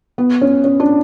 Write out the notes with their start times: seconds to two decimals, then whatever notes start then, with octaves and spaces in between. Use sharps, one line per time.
0.18 B3
0.41 C#4
0.64 C#4
0.80 D4